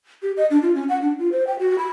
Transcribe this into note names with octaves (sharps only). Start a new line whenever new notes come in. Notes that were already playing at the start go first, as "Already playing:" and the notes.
G4
D#5
D4
F4
C#4
F#5
D4
F4
C5
G5
F#4
B5